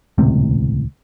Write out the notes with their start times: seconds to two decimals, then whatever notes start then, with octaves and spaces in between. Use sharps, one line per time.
0.18 D#1 C#2 A2 C3